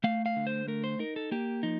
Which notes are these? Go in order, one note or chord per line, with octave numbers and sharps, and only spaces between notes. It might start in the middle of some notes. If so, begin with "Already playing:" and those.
A3 F5
F5
D3
C5
A3 A#4
C5
D#4 A#4
A4
A#3 G4
F3 D#4